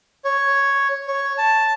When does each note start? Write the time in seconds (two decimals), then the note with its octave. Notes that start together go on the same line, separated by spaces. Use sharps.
0.25 C#5
1.08 C#5
1.38 A5